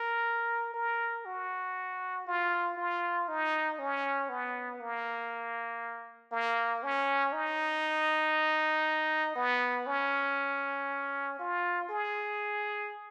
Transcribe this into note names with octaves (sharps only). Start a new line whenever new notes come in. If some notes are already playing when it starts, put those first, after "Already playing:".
Already playing: A#4
A#4
F#4
F4
F4
D#4
C#4
B3
A#3
A#3
C#4
D#4
B3
C#4
F4
G#4